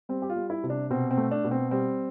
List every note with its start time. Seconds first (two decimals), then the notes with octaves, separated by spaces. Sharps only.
0.09 G3 C4
0.22 G4
0.30 F4
0.36 G3
0.50 E4
0.64 C3
0.70 D4
0.90 B2 C4
1.11 C4
1.17 A3
1.31 D4
1.44 B2
1.51 C4
1.71 G3 C4